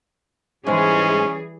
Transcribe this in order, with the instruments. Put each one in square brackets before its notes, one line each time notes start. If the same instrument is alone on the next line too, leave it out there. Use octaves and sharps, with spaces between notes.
[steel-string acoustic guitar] G#2 G#3 [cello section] E3 G3 G#4 [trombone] C#4